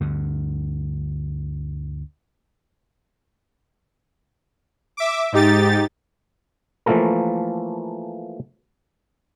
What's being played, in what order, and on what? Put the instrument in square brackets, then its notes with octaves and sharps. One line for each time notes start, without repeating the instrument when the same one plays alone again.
[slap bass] D2 G2 D3
[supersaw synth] E5 D6
G#2 D#4 G4 A6
[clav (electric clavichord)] E3 F3 A3 A#3 A4 A#4